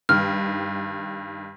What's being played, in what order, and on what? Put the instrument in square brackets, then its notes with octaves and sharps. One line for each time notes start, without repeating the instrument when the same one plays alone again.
[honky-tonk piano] G2 D#3 [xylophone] F6